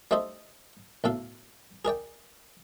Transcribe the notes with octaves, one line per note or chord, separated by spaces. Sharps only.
G3 A3 D#4 A4 C5 D#5
B1 A2 A4 F5
G#4 A#4 D5 G5